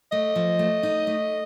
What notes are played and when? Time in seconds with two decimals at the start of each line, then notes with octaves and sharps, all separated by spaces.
0.12 A3 D#5
0.36 F3
0.59 A3
0.83 D#4
1.07 A3